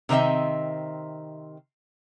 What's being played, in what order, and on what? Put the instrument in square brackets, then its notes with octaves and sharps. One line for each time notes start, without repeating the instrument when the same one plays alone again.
[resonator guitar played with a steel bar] C3 D#3 C4 D#5 E5